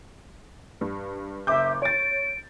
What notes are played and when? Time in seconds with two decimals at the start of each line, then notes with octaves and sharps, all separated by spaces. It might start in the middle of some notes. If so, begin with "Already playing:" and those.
0.81 G2
1.47 F#1 E5 D6 G6
1.82 C#5 A6 D7